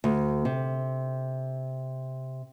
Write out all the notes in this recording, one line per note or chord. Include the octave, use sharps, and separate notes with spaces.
D2
C3